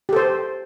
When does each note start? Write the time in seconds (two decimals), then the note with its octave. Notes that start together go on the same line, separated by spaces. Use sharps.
0.09 G4
0.13 A4
0.16 C5